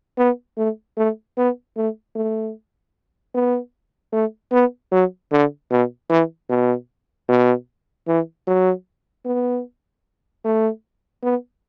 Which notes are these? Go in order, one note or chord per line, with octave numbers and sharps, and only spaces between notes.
B3
A3
A3
B3
A3
A3
B3
A3
B3
F#3
D3
B2
E3
B2
B2
E3
F#3
B3
A3
B3